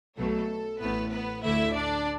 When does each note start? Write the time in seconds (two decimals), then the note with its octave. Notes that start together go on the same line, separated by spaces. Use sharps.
0.17 B1 B2 F#3 A3 A4
0.80 A1 A2 A3 B3 B4
1.12 B3 B4
1.43 D2 D3 A3 E4 E5
1.74 D4 D5